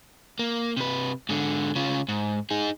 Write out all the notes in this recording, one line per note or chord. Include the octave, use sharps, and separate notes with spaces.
A#3
C3 B4
G#2 D3
C#3 F4
G#2
D#4 G#4